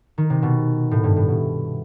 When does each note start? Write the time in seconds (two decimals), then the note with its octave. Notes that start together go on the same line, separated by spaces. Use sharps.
0.18 D#3
0.30 C3
0.42 B2
0.91 A2
1.03 G2
1.16 A2
1.28 B2